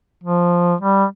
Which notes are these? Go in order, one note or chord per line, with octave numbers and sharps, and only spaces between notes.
F3
G3